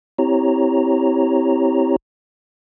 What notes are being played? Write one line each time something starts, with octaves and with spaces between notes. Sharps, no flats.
C4 E4 G4 C#5 A#5